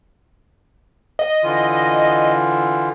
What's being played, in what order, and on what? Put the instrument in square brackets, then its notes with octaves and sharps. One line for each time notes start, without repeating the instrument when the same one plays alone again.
[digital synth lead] D#5
[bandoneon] D3 E3 F4